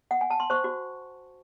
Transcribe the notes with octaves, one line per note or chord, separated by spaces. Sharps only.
F#5
G#5
A5
C6
C5 C#6
F#4